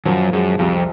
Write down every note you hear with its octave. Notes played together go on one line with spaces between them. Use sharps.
F#2 F3
F#2 G#3
C2 F2